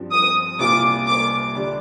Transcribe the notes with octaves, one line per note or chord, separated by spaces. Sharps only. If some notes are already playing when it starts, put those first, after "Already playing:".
Already playing: G2 F3 C4
D#6
C2 A#2 G3 D4 F4 D6
D6
D3 G3 D4